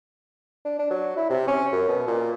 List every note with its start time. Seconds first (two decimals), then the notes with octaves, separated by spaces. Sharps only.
0.65 D4
0.79 D4
0.91 F#3
1.17 E4
1.30 C3
1.48 C#4
1.73 F#2
1.88 B2
2.08 A#2